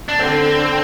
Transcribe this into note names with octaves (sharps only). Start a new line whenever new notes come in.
D4
D3 C4